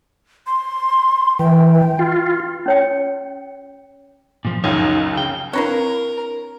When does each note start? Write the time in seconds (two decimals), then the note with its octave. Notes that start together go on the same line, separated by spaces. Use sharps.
0.47 C6
1.39 E3 G5
1.99 F4
2.66 C#4 C#5 G5
4.45 A#2 F3
4.64 C#2 F#2 C#3 D#4 C#5
5.17 C#3 G5
5.53 A#3 C4 D4 E4 A#4 B4 C#5